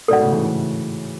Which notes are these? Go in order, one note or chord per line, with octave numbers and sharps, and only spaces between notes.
G#2 B2 A4 D5 F#5
A2 C#3
C#3 E3
A2 C#3